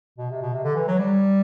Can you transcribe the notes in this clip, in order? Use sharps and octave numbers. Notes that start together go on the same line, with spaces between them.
B2
C3
B2
C3
D3
E3
F#3
G3